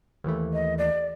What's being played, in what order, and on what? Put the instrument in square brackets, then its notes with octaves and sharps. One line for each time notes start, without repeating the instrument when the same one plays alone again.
[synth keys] D#2 E3 A3
[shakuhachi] D#5
D5